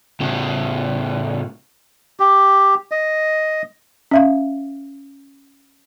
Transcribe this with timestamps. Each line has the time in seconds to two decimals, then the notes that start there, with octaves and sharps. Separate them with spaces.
0.20 A2 C#3
2.20 G4
2.91 D#5
4.11 C#4 E5 F5